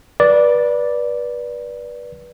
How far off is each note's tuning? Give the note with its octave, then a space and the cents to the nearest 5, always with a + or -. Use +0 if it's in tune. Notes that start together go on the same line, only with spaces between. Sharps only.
B4 -25 D5 +0